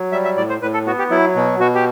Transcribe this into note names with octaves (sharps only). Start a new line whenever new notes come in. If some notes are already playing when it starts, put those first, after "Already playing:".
Already playing: F#3
G3 E5
E5
A2 D5
C5
A2 B4
A4
B3 F#4
G4
F#3 E4
B2
B2 F#4
G4